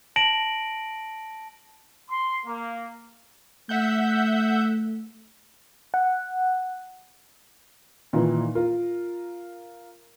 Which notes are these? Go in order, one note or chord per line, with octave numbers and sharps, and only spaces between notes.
A5 A#6 D7 F#7
C6
A#3
A3 E5 F#5 G6
F#5
A#2 D#3 E3
F4 A#4